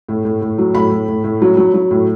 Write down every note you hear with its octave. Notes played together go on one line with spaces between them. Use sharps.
A2
A2
A2
F#3
A2 B5
A2
A2
A2
F#3
F#3
F#3
A2